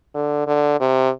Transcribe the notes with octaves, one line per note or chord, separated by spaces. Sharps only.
D3
D3
C3